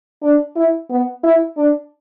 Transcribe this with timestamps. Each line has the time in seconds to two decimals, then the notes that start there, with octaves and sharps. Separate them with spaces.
0.22 D4
0.56 E4
0.90 B3
1.24 E4
1.57 D4